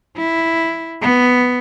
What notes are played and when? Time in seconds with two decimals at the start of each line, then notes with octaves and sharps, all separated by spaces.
0.17 E4
1.01 B3